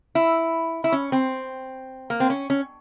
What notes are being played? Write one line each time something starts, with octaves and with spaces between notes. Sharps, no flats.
E4
E4
C#4
C4
A#3
C4
C#4
C#4